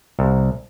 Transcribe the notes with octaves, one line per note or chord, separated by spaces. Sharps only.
C2